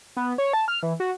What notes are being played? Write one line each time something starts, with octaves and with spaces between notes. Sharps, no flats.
B3
C#5
A5
F6
E3
F#4